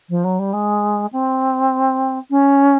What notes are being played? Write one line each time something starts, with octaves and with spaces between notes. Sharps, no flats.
F3
F#3
G3
G#3
C4
C#4